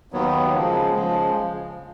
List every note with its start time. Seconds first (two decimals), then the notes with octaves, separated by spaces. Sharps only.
0.12 D#2 D#3 F#3 B3
0.53 C#3 F3 G#3
0.94 C#3 F3 G#3